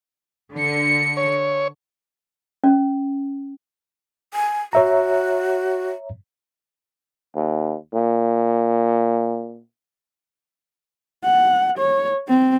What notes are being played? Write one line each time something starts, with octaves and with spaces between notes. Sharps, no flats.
D3 C#7
C#5
C#4
G#5
F#4 C#5 E5 A#5
D#2
A#2
F#5
C#5
C4